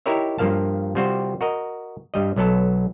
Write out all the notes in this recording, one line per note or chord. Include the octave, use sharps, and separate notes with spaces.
D#4 E4 G4 A#4 C#5 E5
G2 F3 A#3 F5 A5
C3 G3 C4 F4 F#4 C5
F#4 A#4 D#5
G2 G3 D#5
B1 F#3 B3 A4 A5